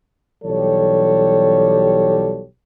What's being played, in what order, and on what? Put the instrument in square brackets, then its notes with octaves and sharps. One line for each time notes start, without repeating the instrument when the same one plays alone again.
[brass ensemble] B1 E3 G3 G4 A4 C#5